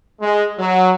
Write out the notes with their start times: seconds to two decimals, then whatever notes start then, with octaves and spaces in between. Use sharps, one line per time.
0.21 G#3
0.59 F#3